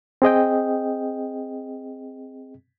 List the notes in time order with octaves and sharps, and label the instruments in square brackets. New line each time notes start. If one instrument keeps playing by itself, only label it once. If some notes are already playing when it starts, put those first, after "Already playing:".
[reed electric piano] C4 G#4 D#5 G5